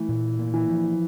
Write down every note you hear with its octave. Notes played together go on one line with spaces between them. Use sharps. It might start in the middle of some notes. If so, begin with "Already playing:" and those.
Already playing: E3 A3
A#2
A#3
E3
F3